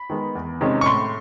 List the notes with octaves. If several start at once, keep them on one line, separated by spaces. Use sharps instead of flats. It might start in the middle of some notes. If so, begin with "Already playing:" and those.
Already playing: B5
D#3 G#3 B3
E2
C3 D#3 G#3 C#4
C#6
A2 C6